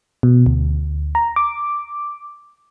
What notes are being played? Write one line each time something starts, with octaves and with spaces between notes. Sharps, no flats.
B2
D2
A#5
D6